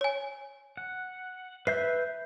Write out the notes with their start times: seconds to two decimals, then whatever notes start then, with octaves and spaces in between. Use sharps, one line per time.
0.01 C#5 G#5
0.77 F#5
1.67 B4 E5 G6 C7